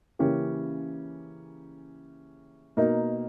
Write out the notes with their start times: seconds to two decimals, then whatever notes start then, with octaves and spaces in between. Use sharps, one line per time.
0.19 C#3 E3 A#3 C#4 G4
2.77 B2 A#3 D#4